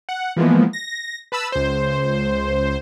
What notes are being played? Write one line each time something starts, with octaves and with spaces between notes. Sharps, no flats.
F#5
E3 F3 G#3 A#3 B3
A#6
B4 A5 B5 E6
C#2 C5